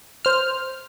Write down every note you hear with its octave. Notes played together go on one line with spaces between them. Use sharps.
C5 F6